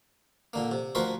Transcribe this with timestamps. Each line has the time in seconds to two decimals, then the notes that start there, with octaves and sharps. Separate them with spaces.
0.53 A#2 D3 A#3
0.71 C3
0.95 D2 F3 F#4 A#4 B4 C6